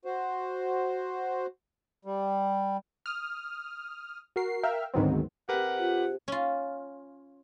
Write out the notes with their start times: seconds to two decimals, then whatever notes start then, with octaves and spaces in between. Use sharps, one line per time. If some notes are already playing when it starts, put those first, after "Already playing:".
0.05 F#4 C5
2.05 G3
3.06 D#6 F6
4.36 F#4 A#4 C7
4.63 A#4 E5 F5 G5 F6
4.94 D2 G#2 D#3 F#3 B3 C4
5.49 C3 G4 G#4 A#4 B4 F#5
5.79 F4
6.28 C#4 F4